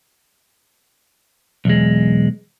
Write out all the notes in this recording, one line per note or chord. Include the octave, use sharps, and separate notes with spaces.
B1 E2 G#3